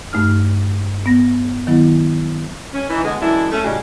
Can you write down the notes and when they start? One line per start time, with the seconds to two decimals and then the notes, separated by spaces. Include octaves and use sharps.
0.13 G2 A3 D#4 F6
1.06 B3 A#6
1.67 D#3 F#3 B3 E4
2.74 C#4
2.90 E3 D#4
3.04 D3 G#3 B3
3.20 F#2 E3 G#3 D4 E4
3.52 A3 C#4
3.65 A2 C#3 G3 G#3 D4 F#4